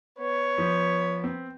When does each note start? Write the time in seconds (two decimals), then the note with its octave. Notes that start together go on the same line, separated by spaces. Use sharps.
0.19 B3 C#5
0.58 F3
1.24 C4